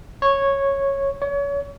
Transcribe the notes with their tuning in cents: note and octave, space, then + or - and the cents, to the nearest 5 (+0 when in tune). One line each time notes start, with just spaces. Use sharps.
C#5 -10
C#5 +30